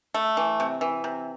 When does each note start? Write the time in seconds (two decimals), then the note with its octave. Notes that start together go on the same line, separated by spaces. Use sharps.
0.14 A3
0.37 E3
0.60 C3
0.81 E3
1.04 C3